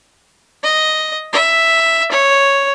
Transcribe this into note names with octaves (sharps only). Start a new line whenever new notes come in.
D#5
E5
C#5